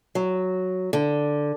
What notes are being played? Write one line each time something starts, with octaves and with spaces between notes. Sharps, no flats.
F#3
D3